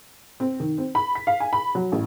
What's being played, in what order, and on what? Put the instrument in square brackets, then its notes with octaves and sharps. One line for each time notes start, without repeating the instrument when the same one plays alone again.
[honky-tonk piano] C4
D#3
C4
B5
B6
F5
G#5
B5
F#3
A1